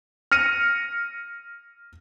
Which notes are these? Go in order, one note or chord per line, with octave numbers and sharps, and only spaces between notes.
F6 A#6 C#7 D#7